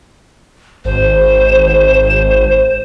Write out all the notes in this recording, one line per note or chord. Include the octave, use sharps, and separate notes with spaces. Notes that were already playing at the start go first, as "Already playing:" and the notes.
G#1 C5
G#1